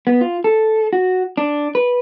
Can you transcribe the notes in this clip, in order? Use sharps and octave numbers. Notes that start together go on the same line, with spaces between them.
B3
F4
A4
F#4
D4
B4